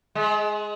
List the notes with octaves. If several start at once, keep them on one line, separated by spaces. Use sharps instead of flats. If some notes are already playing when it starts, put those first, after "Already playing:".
G#3